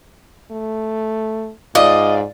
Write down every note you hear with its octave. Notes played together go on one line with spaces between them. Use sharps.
A3
G#2 F4 D5 D#5